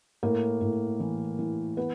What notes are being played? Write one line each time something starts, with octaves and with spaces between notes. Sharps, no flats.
A2 A#3 A#4
A2
E3
E3
B3 B4